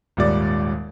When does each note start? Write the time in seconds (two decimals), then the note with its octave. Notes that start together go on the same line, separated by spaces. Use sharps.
0.17 D#1 D#2 G#2 G3 D5 D6